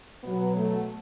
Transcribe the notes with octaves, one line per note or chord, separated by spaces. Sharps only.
B2 F#3 B3
A3